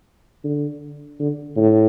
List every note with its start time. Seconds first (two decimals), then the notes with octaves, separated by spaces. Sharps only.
0.44 D3
1.20 D3
1.57 A2